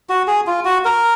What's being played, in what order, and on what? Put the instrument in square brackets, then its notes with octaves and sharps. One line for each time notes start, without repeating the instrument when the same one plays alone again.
[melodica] F#4
G#4
F4
F#4
A#4